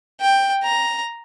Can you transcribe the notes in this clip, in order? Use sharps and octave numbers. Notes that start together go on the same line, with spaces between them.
G5
A#5